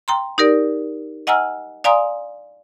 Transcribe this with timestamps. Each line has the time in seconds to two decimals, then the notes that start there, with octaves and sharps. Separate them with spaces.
0.08 G5 A#5 C6
0.38 D#4 G4 A#4 D5
1.27 D#5 F#5 G#5 A#5 E6 F6
1.84 D5 F5 G#5 A#5 C6 D#6